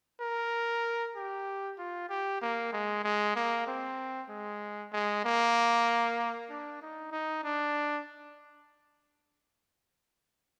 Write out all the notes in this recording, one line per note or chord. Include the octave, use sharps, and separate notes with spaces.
A#4
G4
F4
G4
A#3
G#3
G#3
A#3
C4
G#3
G#3
A#3
D4
D#4
D#4
D4